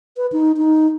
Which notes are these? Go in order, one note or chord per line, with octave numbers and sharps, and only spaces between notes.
B4
D#4
D#4